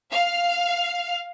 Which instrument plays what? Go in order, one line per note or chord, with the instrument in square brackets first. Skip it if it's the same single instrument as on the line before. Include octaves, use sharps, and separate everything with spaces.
[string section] F5